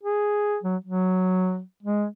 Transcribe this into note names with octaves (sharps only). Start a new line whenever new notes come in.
G#4
F#3
F#3
G#3